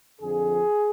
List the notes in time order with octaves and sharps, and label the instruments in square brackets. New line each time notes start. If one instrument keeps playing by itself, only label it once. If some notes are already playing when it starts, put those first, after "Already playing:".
[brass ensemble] F2 D3 F3 G#4